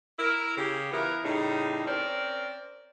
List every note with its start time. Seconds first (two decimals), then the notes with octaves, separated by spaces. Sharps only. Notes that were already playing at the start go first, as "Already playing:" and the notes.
0.19 E4 A#4
0.57 C#3 G4
0.92 E3 B3 E4 F4 A#4
1.24 A2 C#3 G3 D#4
1.86 C4 C#4 A#4 C5 D5